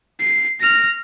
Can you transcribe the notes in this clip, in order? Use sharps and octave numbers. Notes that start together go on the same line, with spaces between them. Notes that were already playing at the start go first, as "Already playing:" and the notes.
C7
F6 A#6